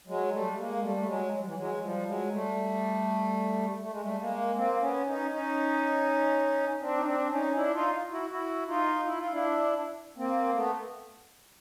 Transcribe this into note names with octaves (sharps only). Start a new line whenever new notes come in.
F#3 G#3
G3 A3
A3
G#3 A#3
G3 A3
A3
F#3 G#3
F#3
G3
E3 F#3
F#3 G#3
F#3
F3 G3
F#3 G#3
G3 A3
A3
G#3
G3 A3
G#3 A#3
A#3 C4
B3 C#4
C#4 D#4
C#4 D#4
C4 D4
D#4
C4 D4
C#4 D#4
D4 E4
D#4 F4
E4 F#4
E4 F#4
D#4 F4
E4
F4
D4 E4
A#3 C4
A3 B3